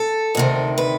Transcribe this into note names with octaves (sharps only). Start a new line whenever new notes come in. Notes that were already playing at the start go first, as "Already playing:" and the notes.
Already playing: A4
D2 C3 D#3
B4